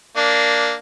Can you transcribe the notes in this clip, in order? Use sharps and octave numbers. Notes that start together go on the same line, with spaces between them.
A#3 D4